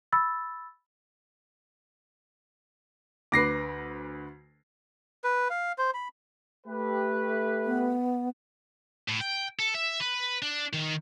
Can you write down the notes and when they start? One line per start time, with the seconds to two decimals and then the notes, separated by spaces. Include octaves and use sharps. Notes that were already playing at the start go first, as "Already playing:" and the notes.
0.12 B5 E6 A6
3.32 D2 B4 D6 A#6 C7
5.24 B4
5.50 F5
5.78 C5
5.94 B5
6.67 A3 G4 B4
7.66 B3
9.09 A2
9.21 G5
9.59 A4
9.74 E5
10.00 B4
10.42 D4
10.73 D#3